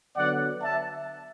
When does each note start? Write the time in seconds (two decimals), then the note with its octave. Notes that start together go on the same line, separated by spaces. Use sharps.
0.17 D3 F#3 B3 D5 F#5
0.63 E5 A5